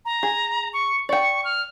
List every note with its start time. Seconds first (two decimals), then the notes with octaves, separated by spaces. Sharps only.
0.05 A#5
0.23 G#4
0.73 C#6
1.09 D5 G5 C#6
1.45 F6